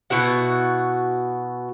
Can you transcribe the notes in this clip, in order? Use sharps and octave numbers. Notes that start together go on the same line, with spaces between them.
B2 E4 F#4 F#5